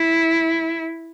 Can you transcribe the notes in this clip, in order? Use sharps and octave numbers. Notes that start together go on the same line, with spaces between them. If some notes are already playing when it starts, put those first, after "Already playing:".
Already playing: E4